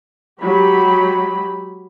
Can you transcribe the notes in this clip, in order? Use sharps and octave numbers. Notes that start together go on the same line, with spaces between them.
F#3 G#3 G4 B5